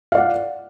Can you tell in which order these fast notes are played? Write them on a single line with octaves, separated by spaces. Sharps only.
F5 D5 F#5